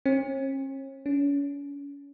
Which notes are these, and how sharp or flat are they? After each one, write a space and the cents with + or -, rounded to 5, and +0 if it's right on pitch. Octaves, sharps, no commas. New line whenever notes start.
C#4 -45
C#4 +35